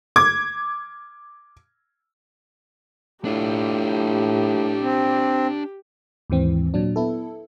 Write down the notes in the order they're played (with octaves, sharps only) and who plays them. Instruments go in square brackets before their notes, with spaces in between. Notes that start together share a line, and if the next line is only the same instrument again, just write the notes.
[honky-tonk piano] D6 G#6
[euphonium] A2 [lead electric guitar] D4 F4 [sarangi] G4
[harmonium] C4
[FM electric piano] D#2 G#2 E3 C4
A#2 F#3 D4
B3 E4 A4